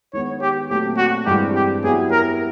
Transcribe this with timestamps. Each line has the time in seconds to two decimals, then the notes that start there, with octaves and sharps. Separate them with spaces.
0.13 D#3 G#3 B3 C#5
0.41 G4
0.70 A#2 F#3 A3 C4 G4
0.97 F#4
1.26 G2 E3 G#3 C4 G4
1.55 G4
1.83 F#3 B3 E4 G4 G#4
2.11 A#4